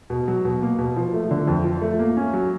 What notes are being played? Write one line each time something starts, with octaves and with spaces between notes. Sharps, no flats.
B2
F#3
B2
A#3
B2
F3
A3
D3
F2
F3
A3
A#3
C#4
F#3